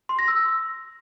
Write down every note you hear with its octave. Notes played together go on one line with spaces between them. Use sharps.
C6
A#6
E6